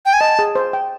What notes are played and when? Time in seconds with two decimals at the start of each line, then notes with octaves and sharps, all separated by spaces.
0.06 G5
0.13 G#5
0.21 D#5 A5
0.39 G#4
0.55 C5
0.73 G5